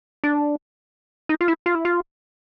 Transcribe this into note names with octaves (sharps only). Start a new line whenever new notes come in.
D4
D#4
F4
E4
F4
E4
F4